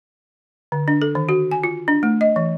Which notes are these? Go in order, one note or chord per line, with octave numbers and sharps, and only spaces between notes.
D3
D4
A4
D#3
F#4
G#5
F4
D4
A3
D#5
E3